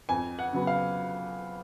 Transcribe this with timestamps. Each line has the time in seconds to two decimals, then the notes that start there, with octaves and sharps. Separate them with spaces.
0.09 F2 G#5
0.39 F#5
0.52 C#3 F#3 B3
0.67 F5